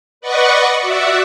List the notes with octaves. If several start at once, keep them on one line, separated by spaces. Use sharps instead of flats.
B4 D5 D#5 F#5 C#6
F#4 D5 E5 F#5